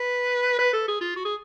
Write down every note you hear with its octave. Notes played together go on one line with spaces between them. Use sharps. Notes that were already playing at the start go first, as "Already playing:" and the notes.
Already playing: B4
B4
A4
G#4
F4
F#4
G#4